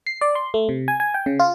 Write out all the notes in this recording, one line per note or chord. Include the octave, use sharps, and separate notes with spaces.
C7
D5
C6
A3
C3
G#5
G#5
G5
C#3
F4